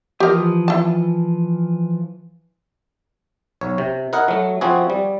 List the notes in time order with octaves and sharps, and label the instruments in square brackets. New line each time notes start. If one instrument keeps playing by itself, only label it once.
[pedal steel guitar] E3 F3 D#6 [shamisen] G4 A#4
[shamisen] E4 A5
[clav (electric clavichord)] B1 C#5
C3
E4 A#4 D#5 F#5
F#3 A3
F3 C4 E4 F#4 G#4
G3